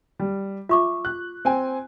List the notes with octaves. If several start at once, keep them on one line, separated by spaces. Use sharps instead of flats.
G3
F4 E5 C#6 D6
F#6
C4 G5 G#5